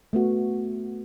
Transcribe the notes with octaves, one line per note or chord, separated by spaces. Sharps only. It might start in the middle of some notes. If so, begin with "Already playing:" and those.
A3 B3 F#4